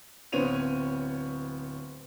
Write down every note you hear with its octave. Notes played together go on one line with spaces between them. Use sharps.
D1 B3 C4 C#5 D#7 F7